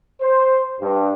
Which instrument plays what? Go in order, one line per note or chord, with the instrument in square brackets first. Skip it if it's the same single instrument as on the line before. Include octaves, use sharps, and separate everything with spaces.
[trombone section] C5
G2